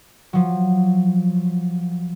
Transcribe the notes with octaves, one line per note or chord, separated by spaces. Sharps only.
F3 F#3